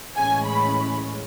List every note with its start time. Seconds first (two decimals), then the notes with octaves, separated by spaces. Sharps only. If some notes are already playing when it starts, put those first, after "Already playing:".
0.16 A2 E3 G#3 C#4 G#5
0.46 B5